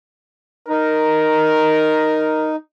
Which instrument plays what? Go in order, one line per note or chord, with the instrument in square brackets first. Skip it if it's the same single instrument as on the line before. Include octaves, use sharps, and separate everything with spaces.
[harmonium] D#4 [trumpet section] A#4